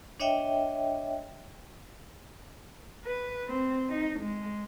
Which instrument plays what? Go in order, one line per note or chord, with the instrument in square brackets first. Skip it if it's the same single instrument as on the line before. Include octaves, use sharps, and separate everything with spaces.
[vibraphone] D4 C#5 D#5 E5 G5
[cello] B4
C4
D#4
G#3